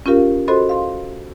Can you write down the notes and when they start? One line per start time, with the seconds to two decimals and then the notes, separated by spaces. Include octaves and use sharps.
0.06 C#4 F4 G4 A#4 F5
0.48 F#4 A4 C5 D#5 B5 C6
0.69 F5 C6